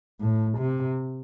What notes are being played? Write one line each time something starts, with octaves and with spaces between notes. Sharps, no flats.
A2
C3